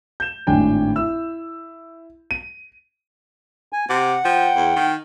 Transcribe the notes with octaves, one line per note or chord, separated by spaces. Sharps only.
G6 E7
G#1 A2 D4 G5 G#5
E4 E6
D#7
G#5
C3 F#5 D6
F3 G5
E2
D#3